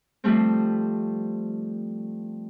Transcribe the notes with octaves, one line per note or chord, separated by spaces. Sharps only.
F3 G3 A3 C4